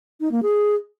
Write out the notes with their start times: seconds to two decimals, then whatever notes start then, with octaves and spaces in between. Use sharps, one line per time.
0.21 D#4
0.32 A#3
0.43 G#4